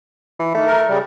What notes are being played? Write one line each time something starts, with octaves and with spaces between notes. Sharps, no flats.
E3
D#3 A3
A#4
C#3 G3